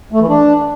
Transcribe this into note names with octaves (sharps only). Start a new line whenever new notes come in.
A3
E3
D4